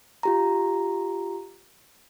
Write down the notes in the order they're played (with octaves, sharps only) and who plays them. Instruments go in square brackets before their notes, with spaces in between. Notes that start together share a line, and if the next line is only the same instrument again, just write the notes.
[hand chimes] F4 G4 A#5